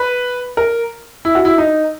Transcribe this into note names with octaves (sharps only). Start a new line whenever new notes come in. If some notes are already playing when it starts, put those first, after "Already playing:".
Already playing: B4
A#4
E4
F#4
E4
D#4